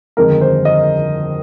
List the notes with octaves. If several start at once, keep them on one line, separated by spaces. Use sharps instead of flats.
G1 F2 D#3 G#3 C4 A#4
C5
D#5